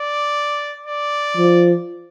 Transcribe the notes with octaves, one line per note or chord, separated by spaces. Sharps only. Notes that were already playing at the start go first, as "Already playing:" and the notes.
Already playing: D5
D5
F3